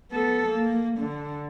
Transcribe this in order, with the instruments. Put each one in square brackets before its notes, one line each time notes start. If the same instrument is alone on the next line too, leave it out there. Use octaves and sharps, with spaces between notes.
[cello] B3 A4
A#3
D3